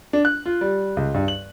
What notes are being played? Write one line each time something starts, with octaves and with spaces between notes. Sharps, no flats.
D4
F#6
F4
G3
C#2
G2
F#7